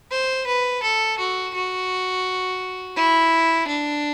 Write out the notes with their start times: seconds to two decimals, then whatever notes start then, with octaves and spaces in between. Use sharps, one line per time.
0.11 C5
0.47 B4
0.83 A4
1.18 F#4
1.54 F#4
2.96 E4
3.68 D4